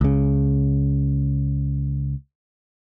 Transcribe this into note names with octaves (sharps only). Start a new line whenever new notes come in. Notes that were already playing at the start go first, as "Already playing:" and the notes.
C#2 C#3